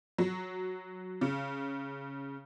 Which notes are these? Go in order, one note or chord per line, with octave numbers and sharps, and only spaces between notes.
F#3
C#3